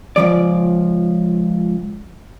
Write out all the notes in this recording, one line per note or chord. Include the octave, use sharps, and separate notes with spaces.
C#2 G2 F3 D5